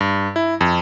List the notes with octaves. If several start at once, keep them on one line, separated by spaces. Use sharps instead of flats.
G2
E4
F2